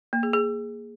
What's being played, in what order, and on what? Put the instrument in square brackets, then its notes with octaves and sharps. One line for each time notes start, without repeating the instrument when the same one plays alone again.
[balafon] A#3
G#4
G#4